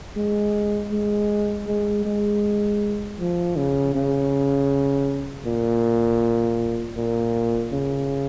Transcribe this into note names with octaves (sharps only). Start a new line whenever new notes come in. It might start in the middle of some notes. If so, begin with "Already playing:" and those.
G#3
G#3
G#3
G#3
F3
C#3
C#3
A#2
A#2
C#3